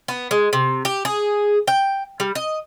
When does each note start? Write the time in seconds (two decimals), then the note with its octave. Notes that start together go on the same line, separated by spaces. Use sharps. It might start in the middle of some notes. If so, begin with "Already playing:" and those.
0.08 B3
0.31 G#3
0.53 C3
0.85 G4
1.05 G#4
1.68 G5
2.20 G3
2.35 D#5